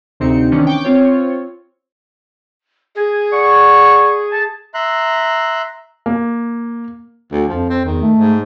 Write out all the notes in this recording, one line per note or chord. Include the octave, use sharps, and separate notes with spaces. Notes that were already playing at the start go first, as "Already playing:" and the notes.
D2 C3 C4 D#4 C#7
D#3 E3 C#4 D4
G5 C#6 D6 G6
C4 F4 C#5
G#4
D5 F#5 C#6
A5
E5 A#5 C6 F#6
A#3
D2
F2 F3
C4
E2 D#3
A3
G#2